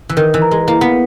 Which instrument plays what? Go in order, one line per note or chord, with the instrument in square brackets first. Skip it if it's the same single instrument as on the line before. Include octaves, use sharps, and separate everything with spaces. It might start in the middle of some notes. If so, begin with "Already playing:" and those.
[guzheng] E3
[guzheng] D#3 [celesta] A#4
[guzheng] E3
[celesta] A#5
[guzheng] G#3
[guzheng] A#3 [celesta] E4
[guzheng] B3